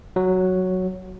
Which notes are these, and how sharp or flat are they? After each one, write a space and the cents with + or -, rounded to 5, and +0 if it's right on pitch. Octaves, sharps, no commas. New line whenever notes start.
F#3 +0 F#4 +0